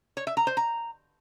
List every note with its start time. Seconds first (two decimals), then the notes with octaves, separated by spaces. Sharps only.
0.17 C#5
0.27 E5
0.37 A#5
0.47 C5
0.57 A#5